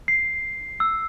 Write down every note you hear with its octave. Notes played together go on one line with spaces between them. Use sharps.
C7
E6